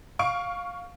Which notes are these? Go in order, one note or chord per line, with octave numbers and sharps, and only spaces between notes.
F5 C#6 D7